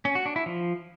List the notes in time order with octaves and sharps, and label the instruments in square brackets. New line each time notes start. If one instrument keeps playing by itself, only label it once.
[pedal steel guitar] C#4
F#4
D4
E4
F3